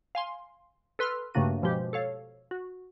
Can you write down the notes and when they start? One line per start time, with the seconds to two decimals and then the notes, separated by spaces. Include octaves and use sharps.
0.15 F5 G#5 C6
0.99 A4 B4 C6 E6 F6
1.34 G2 C#3 A3 A#3 F#4 D#7
1.62 B2 F3 G#3 G4
1.93 A4 C#5 F5
2.51 F#4